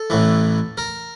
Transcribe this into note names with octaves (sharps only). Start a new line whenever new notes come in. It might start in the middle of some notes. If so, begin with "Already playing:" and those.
Already playing: A4
A1 A2 E3
A#4